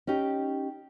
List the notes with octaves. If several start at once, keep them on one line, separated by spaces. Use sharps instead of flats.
C#4 D#4 G4